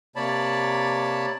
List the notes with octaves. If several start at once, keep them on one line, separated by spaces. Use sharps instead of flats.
C3 A#3 C#5 D5 A5 B5